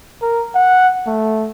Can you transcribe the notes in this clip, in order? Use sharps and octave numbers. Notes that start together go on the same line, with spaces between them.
A#4
F#5
A3